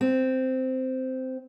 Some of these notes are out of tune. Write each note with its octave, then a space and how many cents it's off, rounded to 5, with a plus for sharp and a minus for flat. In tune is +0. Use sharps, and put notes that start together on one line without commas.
C4 -10